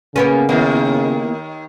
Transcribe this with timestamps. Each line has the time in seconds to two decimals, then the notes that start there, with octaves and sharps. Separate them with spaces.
0.16 C#3 A#3 B3 C#4
0.49 D#2 G#2 D#3 A#3 B3 E4